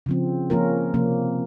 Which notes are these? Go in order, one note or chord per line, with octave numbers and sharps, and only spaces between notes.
C#3 F3 C4
F3 A#3 C#4 F4 A#4
C3 F3 A#3 C#4